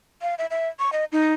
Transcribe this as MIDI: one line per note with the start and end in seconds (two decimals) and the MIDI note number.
0.22 0.35 77
0.38 0.46 76
0.51 0.69 76
0.79 0.90 85
0.92 1.05 75
1.12 1.34 63